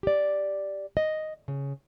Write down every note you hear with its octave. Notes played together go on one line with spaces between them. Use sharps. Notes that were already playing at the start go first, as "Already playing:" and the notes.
G4 D5
D#5
C#3